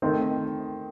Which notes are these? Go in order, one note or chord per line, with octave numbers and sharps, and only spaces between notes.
D#3 A3 C4 D#4